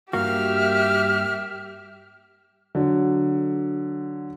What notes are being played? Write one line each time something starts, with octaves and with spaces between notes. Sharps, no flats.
G2 A#3 F#4 G4 E5 F6
D3 F#3